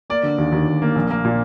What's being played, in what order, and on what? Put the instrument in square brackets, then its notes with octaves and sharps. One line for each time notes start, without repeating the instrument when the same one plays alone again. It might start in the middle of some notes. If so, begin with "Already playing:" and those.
[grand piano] A#3 D5
D3
D#2
D#2
D#2
A#3
A#1
A#3
A#2